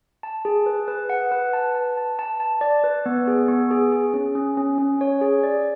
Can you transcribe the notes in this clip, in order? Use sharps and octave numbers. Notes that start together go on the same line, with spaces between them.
A5
G#4
B4
B4
F#5
B4
A5
A5
A5
A5
A5
D5
B4
B3
G#4
B3
G#4
G#4
C#4
C#4
C#4
C#4
C#5
G#4
D5